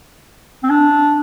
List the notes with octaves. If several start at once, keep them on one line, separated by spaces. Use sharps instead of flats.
C4
D4